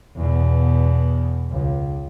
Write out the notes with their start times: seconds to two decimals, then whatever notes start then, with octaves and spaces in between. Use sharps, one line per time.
0.16 E2 B2
1.51 C#2